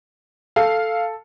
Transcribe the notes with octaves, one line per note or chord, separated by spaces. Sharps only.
A4 F5